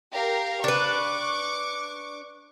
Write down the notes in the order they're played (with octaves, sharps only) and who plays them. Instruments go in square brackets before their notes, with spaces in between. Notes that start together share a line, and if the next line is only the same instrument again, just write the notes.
[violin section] G4 A#4 F5
[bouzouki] D4 B4 [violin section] C#6 D6